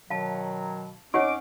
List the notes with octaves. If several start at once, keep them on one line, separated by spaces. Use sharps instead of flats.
B2 D#3 F#3 F5 A5
F2 C#4 D#4 C#5 F#5 C#6 D6